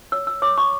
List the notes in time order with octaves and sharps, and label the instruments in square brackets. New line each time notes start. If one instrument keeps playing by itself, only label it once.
[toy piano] C#5 E6
E6
C#5 D6
C#6